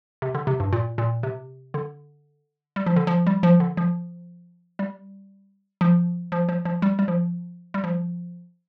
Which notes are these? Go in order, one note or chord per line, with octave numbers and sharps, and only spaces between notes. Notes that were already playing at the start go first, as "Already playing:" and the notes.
C3
D3
C3
G2
A#2
A#2
C3
D3
G3
F3
D3
F3
G3
F3
D3
F3
G3
F3
F3
F3
F3
G3
G3
F3
G3
F3